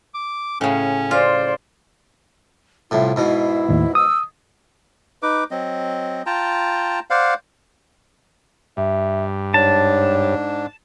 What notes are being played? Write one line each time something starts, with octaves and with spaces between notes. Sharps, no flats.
D6
A2 C#3 C#4
F4 C5 D5
C2 A2 F4
G#2 B2 E4
D#2 A2
D#6 E6
D#4 B4 D6
F#3 C4 D#5
F4 G5 A5 A#5
C5 D5 F5 F#5
G2 E5
G#2 D4 C#5 A5